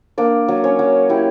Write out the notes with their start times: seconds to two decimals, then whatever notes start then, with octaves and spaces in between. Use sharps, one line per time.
0.18 A#3 D4 D5
0.48 F#3
0.64 C#4 C#5
0.79 F#3
1.09 E4 G4